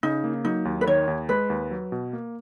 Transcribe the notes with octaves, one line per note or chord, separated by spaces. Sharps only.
C#3 D#4
A#3
F#3 D#4
D#2
B4
D#3 C#5
D#2
G#3 B4
D#2
F#3
B2
A#3